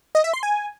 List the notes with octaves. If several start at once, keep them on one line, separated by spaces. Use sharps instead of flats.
D#5
E5
C6
G#5